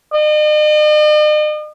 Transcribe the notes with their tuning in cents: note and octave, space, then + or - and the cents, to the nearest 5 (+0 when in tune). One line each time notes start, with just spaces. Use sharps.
D#5 -45